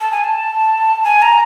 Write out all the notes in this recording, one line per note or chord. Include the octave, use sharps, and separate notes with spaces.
A5
G#5
A5
G#5
A#5